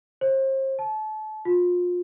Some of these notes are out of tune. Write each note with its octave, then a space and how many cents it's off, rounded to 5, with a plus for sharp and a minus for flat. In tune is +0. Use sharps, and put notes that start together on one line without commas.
C5 +35
A5 -30
F4 +30